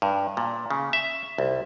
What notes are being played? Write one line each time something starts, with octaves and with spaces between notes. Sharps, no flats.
G2
A#2
C#3
E5
C2